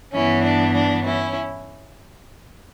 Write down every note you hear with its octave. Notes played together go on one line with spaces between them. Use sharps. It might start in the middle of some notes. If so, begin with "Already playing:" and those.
G2 E3 B3 C#4 E4
D4
D4
C#4 E4